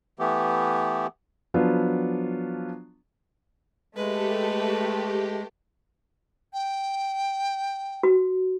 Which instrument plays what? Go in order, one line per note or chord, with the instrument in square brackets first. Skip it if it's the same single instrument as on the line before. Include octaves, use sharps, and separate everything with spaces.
[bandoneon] E3 A3 B3 G4
[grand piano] F3 F#3 B3 D4 F4
[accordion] G#3 [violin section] A3 [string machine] G4 [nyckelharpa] B4
[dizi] G5
[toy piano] F#4